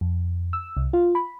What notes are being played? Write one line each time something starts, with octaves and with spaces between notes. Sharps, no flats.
F2
E6
C2
F4
B5